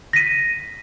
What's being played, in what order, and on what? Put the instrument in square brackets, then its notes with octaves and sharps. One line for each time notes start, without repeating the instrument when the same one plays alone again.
[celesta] A#6 B6 D#7